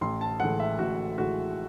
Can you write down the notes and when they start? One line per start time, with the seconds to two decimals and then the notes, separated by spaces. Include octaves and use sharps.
0.01 A1 C6
0.21 A5
0.40 A2 E3 G#3 F#5
0.60 E5
0.79 A1 F#4
1.18 A2 E3 G#3 F#4